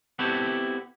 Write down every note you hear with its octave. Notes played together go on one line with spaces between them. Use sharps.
B3 C4 E4 F#4 G4 A4